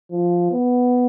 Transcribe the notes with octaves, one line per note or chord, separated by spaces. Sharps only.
F3
B3